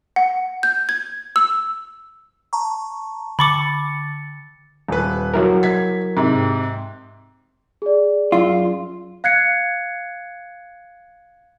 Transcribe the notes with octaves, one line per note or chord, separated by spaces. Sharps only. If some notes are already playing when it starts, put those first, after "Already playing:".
F#5
G6
G#6
E6
A5 A#5 C#6
D3 B5 C#6 D6 A6 C#7
D#1 B4
F#3 E4 A#4
G#6 B6
G#2 C3
G#4 D5
F#2 F4
F5 F#6 G#6 C7 C#7